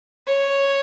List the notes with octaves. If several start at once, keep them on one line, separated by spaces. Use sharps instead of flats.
C#5